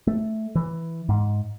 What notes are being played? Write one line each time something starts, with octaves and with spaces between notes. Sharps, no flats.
A3
E3
G#2